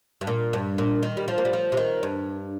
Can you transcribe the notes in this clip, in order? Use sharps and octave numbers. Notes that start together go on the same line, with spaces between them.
G2
A#2
G2
A#2
D#3
G3
F3
A#3
G3
F3
C3
D#3
G2